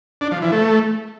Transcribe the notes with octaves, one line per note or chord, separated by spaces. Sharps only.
D4
F3
E3
A3